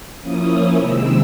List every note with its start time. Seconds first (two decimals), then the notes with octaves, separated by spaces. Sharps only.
0.21 F3 A#3 C#4 E4 D#6
0.78 C3 D#3 G#3 C4 E6